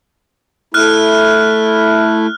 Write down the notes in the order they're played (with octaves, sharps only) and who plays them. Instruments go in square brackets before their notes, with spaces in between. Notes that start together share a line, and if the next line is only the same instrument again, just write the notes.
[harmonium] A3 E4 [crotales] F6 F#6